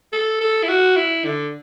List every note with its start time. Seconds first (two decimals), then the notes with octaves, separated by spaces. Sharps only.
0.12 A4
0.41 A4
0.63 E4
0.69 F#4
0.96 E4
1.25 D3